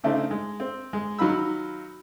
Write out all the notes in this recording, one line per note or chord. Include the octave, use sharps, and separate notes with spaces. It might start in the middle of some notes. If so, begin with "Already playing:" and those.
C#3 A3 C4 D4 D#4
G#3
C4
G#3
D#3 F#3 D#4 F4 B5 E6